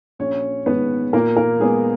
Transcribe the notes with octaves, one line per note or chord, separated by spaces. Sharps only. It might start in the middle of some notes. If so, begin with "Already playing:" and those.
A#1 C#4 C#5
G#2 D#3 G#3 B3 B4
A#2 A#3 A#4
A#3 A#4
G#3 B3 G#4